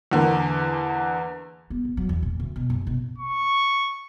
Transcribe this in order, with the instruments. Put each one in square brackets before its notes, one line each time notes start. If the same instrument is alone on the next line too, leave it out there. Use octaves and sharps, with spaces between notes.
[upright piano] E2 D3 A#3
[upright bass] B3
D#1
F#3
E2
A#2
D2
B2
F#1
B2
[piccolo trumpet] C#6